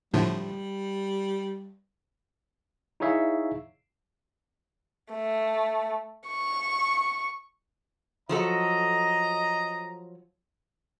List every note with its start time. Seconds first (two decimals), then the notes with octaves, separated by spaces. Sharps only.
0.14 A2 D3 F3 G3
3.00 D#4 E4 G#4 C#5 E5 F5
5.13 A3
6.28 C#6
8.29 F3 F#3 A4 D#5 A#5